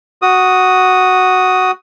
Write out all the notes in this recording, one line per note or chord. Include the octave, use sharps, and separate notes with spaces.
F#4 D#6